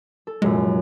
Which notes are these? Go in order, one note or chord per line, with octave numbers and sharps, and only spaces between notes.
A4
F1 F#2 A#2 G#3